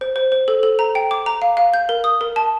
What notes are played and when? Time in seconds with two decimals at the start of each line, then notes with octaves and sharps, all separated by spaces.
0.01 C5
0.16 C5
0.32 C5
0.48 A4
0.63 A4
0.79 A#5
0.95 G5
1.11 D6
1.26 A#5
1.42 F5
1.57 F5
1.74 G6
1.89 A#4
2.04 D#6
2.21 A#4
2.36 A5